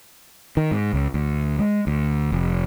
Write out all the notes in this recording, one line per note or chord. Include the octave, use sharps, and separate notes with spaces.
D#3
G#2
C#2
D2
G#3
D2
F1